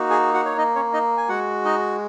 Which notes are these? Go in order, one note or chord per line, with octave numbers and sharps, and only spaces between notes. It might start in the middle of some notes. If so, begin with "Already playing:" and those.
Already playing: A#3 D#4 F#4
G#4 G#5
F#4 F#5
C#5
D#4 D#5
C#4 C#5
D#4 D#5
G#5
G#3 F#4 F#5
D#4 D#5